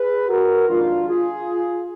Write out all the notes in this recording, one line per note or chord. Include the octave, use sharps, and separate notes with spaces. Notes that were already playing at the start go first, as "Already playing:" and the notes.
Already playing: G#4 B4
F#4 A#4
F2 D#3 G#3 D4 F4
F4 G#4